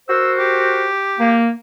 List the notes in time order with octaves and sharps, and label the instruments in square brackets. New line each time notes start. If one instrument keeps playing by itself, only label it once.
[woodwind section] F#4 A#4 C5 [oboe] E6
[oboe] G4
[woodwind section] A#3